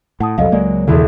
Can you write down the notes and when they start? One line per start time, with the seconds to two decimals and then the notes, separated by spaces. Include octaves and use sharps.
0.20 A2 F#5 A5 D#6
0.38 C2 F2 F#3 A4 D#5 F5
0.52 C#2 G#3 A#3 D5
0.87 B1 E2 C#3 E3